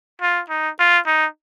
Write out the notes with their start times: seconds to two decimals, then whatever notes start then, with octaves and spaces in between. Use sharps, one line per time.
0.22 F4
0.50 D#4
0.79 F4
1.07 D#4